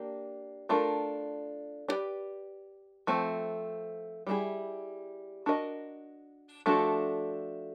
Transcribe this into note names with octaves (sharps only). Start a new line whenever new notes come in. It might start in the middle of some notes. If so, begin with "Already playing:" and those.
Already playing: A#3 D4 G4
A3 D4 F4 A#4
D4 G4 B4 D5
F3 A3 C4
G3 C4 E4 G#4
D4 F#4 A#4 D#5
F3 A3 D4 F#4 A4